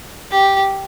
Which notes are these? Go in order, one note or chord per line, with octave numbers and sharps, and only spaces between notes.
G4